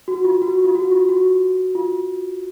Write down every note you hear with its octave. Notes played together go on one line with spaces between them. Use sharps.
F#4
F4
F#4
F4
F#4
F4
F#4
F4